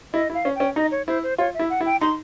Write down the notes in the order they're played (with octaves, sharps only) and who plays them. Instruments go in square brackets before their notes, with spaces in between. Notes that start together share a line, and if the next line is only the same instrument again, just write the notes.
[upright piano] E4 [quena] D#5
[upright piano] E4
[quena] F5
[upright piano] C#4
[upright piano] C#4 [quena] G5
[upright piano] D#4 [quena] D#5
[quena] C#5
[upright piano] E4 [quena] C5
[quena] C5
[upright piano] F4 [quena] C#5
[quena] E5
[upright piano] E4
[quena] F#5
[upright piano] E4
[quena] G5
[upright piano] D#4 [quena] C6